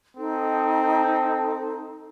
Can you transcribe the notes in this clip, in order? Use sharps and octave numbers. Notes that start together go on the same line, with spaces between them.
C4 D#4 A4